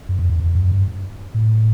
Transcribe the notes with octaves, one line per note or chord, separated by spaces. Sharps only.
F#2
F2
E2
F2
F#2
G2
A2